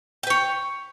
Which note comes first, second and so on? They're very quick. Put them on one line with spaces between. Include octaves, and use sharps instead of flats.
G5 B4 C#5